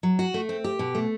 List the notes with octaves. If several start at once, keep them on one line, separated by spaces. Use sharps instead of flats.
F#3
F#4
A3
C4
G4
B2
A3